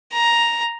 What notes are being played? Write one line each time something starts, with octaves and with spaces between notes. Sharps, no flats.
A#5